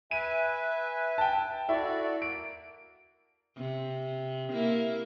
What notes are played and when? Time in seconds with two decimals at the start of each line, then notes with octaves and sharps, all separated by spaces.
0.11 B4 E5 G#5 D#7
1.18 G5 A5
1.69 E4 F#4 A4 D5
2.22 A#3 D7
3.58 C3
4.51 A#3 E4 A#4